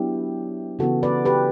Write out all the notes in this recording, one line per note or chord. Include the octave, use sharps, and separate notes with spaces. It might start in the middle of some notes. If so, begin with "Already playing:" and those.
Already playing: F#3 B3 D4 E4 G4
C#3 E3 B3 F#4 A4
B4 D5
G4 B4